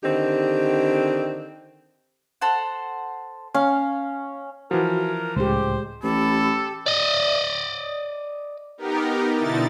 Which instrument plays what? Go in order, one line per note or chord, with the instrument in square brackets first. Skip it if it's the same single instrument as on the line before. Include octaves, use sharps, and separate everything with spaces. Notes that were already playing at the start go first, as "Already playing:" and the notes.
[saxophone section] D3 D#3 C4 G4
[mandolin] A4 C5 F#5
[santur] C#4 [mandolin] F5
[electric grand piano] E3 F3 [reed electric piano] F#4 [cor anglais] A#4
[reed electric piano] C#2 A2 [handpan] G#3 G4 [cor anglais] C5
[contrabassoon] A1 [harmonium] G4 [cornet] A4 [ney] B5
[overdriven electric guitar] D5 D#5
[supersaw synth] B3 D#4 G4 A#4
B2 D3 D#4 E4 A6